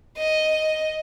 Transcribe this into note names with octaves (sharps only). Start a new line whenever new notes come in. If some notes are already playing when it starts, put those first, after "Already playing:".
D#5